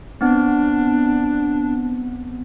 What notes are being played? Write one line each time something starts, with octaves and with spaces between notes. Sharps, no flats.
B3 C4 D4